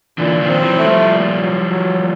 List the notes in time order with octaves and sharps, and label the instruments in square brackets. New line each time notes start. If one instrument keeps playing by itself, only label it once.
[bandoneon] A#2 [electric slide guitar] D3 E3
[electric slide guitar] D#3 F3
[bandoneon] C4
[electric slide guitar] E3 F#3
[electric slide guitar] F#3 [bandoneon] A3
[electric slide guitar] F3 G3
[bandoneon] A#2
F#3
F#3
A#2